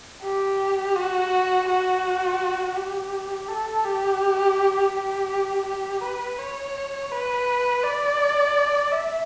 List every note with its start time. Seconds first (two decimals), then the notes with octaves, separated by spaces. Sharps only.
0.23 G4
0.96 F#4
1.68 F#4
2.76 G4
3.48 A4
3.85 G4
4.94 G4
5.66 G4
6.02 B4
6.38 C#5
7.11 B4
7.84 D5
8.92 E5